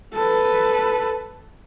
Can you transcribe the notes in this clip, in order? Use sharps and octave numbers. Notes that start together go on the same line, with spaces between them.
A4 B4